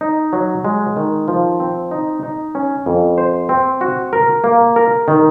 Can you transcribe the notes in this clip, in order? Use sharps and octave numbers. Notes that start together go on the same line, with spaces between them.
D#4
F#3
G#3
D#3
F3
C4
D#4
D#4
C#4
F2
C5
C4
F#4
A#4
A#3
A#4
D#3